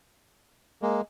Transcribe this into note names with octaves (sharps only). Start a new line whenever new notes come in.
G#3 A#3